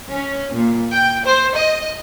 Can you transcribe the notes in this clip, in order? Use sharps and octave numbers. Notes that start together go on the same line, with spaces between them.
C#4
A#2
G5
C5
D#5